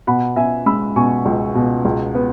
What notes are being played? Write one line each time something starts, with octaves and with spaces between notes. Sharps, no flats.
B2 F#5 B5
B2 E5 G#5
G#3 B5 E6
B2 G#5 C#6
C#2
B2
C#2
B3